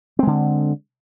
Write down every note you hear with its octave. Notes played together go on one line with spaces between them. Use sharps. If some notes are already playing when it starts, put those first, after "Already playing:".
D3 G#3 C4